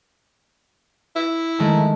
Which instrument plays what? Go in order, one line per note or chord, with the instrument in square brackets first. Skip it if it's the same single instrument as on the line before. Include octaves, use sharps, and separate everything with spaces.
[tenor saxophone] E4
[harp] D#3 G#3 A3